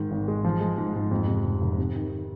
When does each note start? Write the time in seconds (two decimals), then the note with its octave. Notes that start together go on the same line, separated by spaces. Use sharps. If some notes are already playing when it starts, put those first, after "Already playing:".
Already playing: G#2 D#3
0.11 G#1
0.28 G#3
0.44 F3
0.61 G#3
0.78 G#2
0.95 G#2
1.11 F2
1.28 C3
1.44 F1
1.62 F1
1.78 C3
1.95 D#3